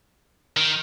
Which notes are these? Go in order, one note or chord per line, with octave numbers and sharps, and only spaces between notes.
D#3